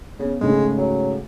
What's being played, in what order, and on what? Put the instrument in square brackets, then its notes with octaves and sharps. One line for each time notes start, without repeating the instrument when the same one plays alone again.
[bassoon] C#3 [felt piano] B3
[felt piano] G#2 C#3 A3 [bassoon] G#3
[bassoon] F#3